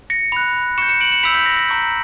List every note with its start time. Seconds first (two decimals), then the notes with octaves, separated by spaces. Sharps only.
0.10 A#6 C#7
0.32 B5 F#6
0.78 C#6 G6 C#7 E7
0.89 C#7 E7
1.00 D7 F#7
1.12 C#7 E7
1.23 B5 E6 G6 B6 D7
1.34 G6 B6
1.46 A#6
1.57 A#6
1.68 A#5 C#6 G6